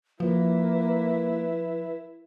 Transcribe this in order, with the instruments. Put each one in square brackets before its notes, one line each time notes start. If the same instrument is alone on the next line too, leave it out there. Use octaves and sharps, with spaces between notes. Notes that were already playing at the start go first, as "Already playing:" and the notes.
[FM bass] F3 [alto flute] A#3 [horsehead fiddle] E4 [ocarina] B4